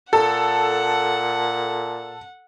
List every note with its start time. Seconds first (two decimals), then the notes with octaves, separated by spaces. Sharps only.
0.13 A#2 A4 F#5